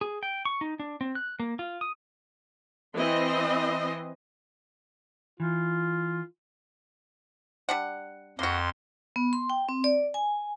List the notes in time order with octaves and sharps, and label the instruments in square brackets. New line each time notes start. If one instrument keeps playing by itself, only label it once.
[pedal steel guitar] G#4
G5
C#6
D#4
D4
C4
F#6
A#3
F4
D#6
[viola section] E3 C4 D#5 C6
[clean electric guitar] E3 [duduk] F4
[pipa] G3 D4 F#5
[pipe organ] F2 C6 [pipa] A#3 F#4
[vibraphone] B3
C6
G5
C4
D5
G#5